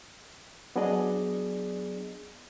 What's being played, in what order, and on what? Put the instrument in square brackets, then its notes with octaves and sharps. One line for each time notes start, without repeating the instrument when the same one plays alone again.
[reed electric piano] F#3 B3 D4 G#4 D5 D#5